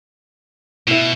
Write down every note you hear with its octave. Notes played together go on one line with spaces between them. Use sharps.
B2 E4 E5